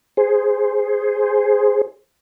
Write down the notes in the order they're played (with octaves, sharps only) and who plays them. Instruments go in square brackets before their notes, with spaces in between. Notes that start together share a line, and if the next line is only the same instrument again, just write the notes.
[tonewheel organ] G#4 C5